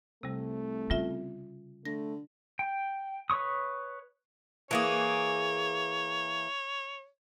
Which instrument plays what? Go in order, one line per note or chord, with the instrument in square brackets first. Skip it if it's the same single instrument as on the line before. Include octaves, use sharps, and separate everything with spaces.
[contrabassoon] C2 [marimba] C3 G3 [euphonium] A3
[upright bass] C#3 [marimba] G3 F4 E5
[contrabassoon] D3 [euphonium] A3 [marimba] A#6
[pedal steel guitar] G5
B4 C#5 C#6 D#6
[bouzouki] E3 A#3 G#4 [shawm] C#5